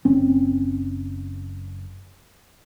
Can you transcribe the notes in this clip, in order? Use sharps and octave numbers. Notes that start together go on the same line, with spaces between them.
F#1 C4 C#4